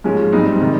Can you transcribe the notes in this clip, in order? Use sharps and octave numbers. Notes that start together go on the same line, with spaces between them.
G#2 F3 G#3 C#4
G#2 G3 C4 D#4
C3 D#3 G3